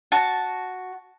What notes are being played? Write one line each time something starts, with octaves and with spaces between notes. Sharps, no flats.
F#4 A5